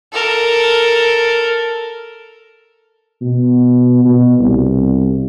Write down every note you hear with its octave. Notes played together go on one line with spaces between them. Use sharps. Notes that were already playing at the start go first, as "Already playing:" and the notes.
A4 A#4
B2
B2
C2